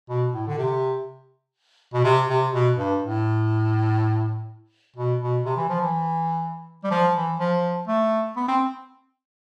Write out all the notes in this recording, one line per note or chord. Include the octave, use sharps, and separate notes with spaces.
B2
A2
D3
C3
B2
C3
C3
B2
G2
A2
B2
B2
C3
E3
F3
E3
G3
F3
E3
F3
A3
B3
C4